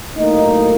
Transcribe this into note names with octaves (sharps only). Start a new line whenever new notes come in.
A2 F#3 A#3 D#4